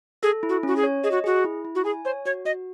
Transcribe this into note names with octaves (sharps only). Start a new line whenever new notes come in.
G#4 A4
E4
F#4
C#4 F#4
G#4
C#5
G#4 D#5
F#4
F#4 G#4
E4
E4
F#4
G#4 G#5
C5 C#5
F#4 C#5
F#4 D#5